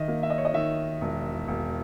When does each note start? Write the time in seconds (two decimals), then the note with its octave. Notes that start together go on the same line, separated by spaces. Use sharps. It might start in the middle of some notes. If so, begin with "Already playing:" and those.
Already playing: D#3 D#5 E5
0.08 A#3
0.23 E5
0.30 D#5
0.38 C#5
0.45 D#5
0.54 D#3 E5
1.01 E1
1.48 E1